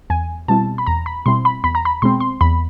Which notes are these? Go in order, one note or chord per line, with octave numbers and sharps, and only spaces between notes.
E2 G#5
B2 G3 C4 E4 A5
B5
E2 A#5
B5
B2 G3 C4 E4 C6
B5
E2 B5
A#5
B5
B2 G#3 C4 C6
C6
E2 B5